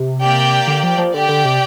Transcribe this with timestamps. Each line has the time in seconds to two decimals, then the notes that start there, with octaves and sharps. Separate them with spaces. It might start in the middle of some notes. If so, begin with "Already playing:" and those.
Already playing: C3
0.22 A#3 G4 D5 G5
0.68 D3
0.83 F3
0.98 F3
1.14 D3 G4 D5 G5
1.29 D3
1.45 C3